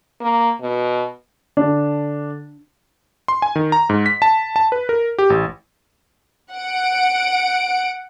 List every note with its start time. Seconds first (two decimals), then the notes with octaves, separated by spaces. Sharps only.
0.21 A#3
0.61 B2
1.57 D3 D4
3.28 C6
3.42 G#5
3.56 D#3
3.72 A#5
3.89 G#2
4.06 B6
4.22 A5
4.56 A5
4.72 B4
4.89 A#4
5.18 G4
5.30 A1
6.53 F#5 D7